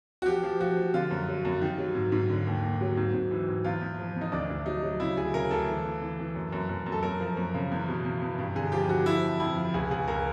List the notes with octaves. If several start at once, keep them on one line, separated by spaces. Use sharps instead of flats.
F#4
F3 G4
F3
F3 F#4
F3
D3 F4
F#2
F#3
F#2
D#3
F#3
G#2
G#2
D3
D#2
D#2
F#3
G#2
G#2
E3
G#2
E2 F4
E2
F3
E2
D#4
D2 D4
D2
F#3 D#4
F#3
C#3 E4
D2 G#4
C#3 A#4
D2 A4
E3
E3
E3
E3
F#2
F#2
F#2
F#2
A4
F#2 A#4
F3
F#2
C#3
E2
B2
E2
E2
G2
D3 G#4
F3 G4
D3 F#4
F3 E4
F2
F2 E4
F3
C#2 G#4
C#2 G#4
C#2 A#4